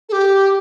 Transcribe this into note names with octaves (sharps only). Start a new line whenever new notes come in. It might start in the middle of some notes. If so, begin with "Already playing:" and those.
A4
G4